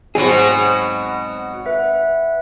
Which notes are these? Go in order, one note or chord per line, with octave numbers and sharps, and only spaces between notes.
G#2 B2 F#3 C4 F#4 G#4
B4 E5 F#5